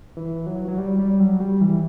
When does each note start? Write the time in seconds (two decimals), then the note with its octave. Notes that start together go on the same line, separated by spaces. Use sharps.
0.17 E3
0.47 F#3
0.68 F#3
0.78 G3
0.99 G3
1.20 F#3
1.40 G3
1.61 E3